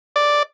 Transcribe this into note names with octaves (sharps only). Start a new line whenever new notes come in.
D5